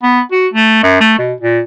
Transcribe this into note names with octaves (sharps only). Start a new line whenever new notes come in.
B3
F#4
A3
F#2
A3
B2
A#2